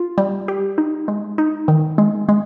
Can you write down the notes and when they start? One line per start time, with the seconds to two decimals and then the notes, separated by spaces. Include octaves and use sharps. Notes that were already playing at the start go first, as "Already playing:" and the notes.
Already playing: F4
0.18 G3
0.48 G4
0.78 D#4
1.08 G#3
1.38 D#4
1.68 D#3
1.98 G#3
2.29 G#3